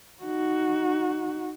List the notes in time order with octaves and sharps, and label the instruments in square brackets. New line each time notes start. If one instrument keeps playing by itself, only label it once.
[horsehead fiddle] D#4 F#4